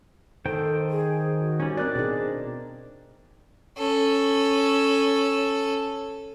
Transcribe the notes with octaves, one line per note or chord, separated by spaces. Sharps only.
D#3 A4 C5 G5
G#4
F#4
G3 C#4 D#4
C4 D4 A#4 D5 F#6
B2 D#4 G#4
C#4 A4